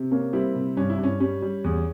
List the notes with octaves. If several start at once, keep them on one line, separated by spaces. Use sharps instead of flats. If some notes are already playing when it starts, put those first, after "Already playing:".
Already playing: C3
A#3 C#4
G3 C4 E4
C3
G2 C#4
E4
G2 C#4
G3 C#4
G3
E2